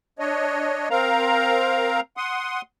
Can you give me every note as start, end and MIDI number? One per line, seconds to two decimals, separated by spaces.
0.19 0.88 62
0.19 0.88 73
0.19 0.88 75
0.90 2.00 60
0.90 2.00 70
0.90 2.00 77
0.90 2.00 82
2.17 2.61 78
2.17 2.61 84
2.17 2.61 87